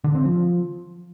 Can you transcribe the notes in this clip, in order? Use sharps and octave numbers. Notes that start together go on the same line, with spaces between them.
D3
C4
F3